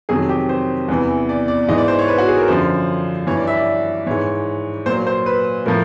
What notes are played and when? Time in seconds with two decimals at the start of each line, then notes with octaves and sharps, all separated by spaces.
0.09 F2 C3 D#3 F#3 G#4
0.29 G4
0.49 C5
0.89 E2 C3 E3
1.29 D5
1.48 D5
1.68 G#2 E3 D#5
1.78 D5
1.88 C5
1.99 C#5
2.08 B4
2.18 F#4
2.28 G#4
2.38 A#4
2.48 F#2 D3 F3 C5
3.27 G2 E3 C#5
3.37 D5
3.47 E5
3.57 D5
4.07 G#2 E3 C#5
4.86 A#2 F#3 C5
5.07 C5
5.26 B4
5.66 A2 F3 A#4